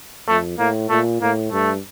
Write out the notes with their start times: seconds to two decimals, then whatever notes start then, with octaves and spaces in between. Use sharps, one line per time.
0.28 F2 A3
0.58 A2 A#3
0.89 A#2 A3
1.21 A2 A#3
1.52 G2 A3